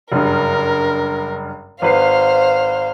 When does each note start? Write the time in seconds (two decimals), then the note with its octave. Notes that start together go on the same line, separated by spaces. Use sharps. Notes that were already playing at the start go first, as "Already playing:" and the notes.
0.12 F#1 G2 A#4
1.82 G#1 B4 C5 F5 C7